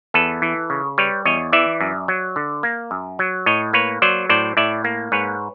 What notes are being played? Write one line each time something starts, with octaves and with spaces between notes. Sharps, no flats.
E2 A4 B4
E3
C#3
G3 B4 C#5
E2 C#5 D#5
E3 D5 E5
F#2
F#3
D3
A#3
F#2
F#3
A2 C#5 D#5
A#3 B4 C#5
F#3 C5 D5
A2 C5 D5
A2 D5 E5
A#3
G#2 B4 C#5